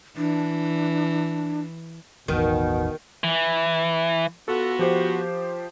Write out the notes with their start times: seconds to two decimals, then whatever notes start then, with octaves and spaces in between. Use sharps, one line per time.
0.17 E3 D4
2.28 E1 A1 E2 B2 D#3
3.24 E3
4.48 B3 F4 F#4 A4
4.79 F3 G4 C5